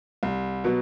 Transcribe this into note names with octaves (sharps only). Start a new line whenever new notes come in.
C2
B2 F#3 B3